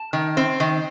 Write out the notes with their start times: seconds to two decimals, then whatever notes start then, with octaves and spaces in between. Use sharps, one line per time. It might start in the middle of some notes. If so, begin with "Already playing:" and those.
Already playing: A5
0.13 D#3
0.37 C4
0.60 D#3